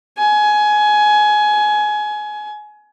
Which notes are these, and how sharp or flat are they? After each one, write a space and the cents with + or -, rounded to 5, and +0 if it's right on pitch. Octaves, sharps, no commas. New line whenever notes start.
G#5 +20